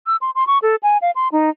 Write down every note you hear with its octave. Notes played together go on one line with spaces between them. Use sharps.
E6
C6
C6
C#6
A4
G#5
F5
C6
D#4